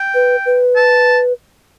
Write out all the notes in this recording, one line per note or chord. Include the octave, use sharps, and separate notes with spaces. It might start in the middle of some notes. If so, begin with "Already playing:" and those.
Already playing: G5
B4
B4
A5